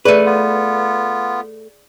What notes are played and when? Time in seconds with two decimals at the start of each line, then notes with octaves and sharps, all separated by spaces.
0.05 A3 G#4 B4 D5 D#7
0.26 B3 F4